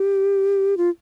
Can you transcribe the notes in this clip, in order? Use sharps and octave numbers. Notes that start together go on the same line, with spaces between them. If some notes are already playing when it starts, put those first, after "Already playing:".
Already playing: G4
F4